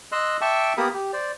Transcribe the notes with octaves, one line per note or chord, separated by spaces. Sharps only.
D#5 C6 E6 F#6
E5 G5 A5 C#6 D6 E6
A#3 B3 G4 A#4 B5 D#6
G4
C5 D5